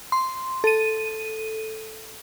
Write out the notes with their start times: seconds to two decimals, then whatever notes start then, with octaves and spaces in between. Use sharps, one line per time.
0.12 C6
0.64 A4 D#7